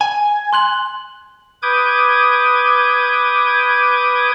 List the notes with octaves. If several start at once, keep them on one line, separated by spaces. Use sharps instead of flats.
G#5
C6 F#6 F#7
B4 D6 D#6 G6 G#6